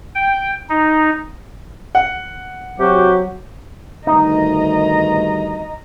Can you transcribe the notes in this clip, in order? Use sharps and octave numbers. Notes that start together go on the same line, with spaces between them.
G5
D#4
F#5
C3 F#3 F#4 G4
D2 G2 D#3 D#4 D#5 A#5